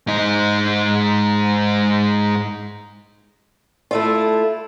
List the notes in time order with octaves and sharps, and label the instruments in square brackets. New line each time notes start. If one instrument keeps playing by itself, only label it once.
[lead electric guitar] G#2 D#4
[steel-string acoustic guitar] A3 E4 F4